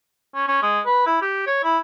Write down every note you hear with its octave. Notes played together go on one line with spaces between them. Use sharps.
C#4
C#4
G#3
B4
E4
G4
C#5
E4